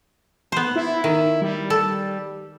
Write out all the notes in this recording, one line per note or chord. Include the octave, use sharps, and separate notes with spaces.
B3 C5
E4
D#3
G3
A4